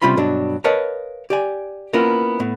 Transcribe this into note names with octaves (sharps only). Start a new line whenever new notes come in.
C3 G3 C#4 F4 B5 C6
G2 B2 F#3 D4
A#4 B4 C#5 D#5 F5 A5
G4 D5 G#5
A#3 B3 C#4 E4 F4 A#4
A2 B3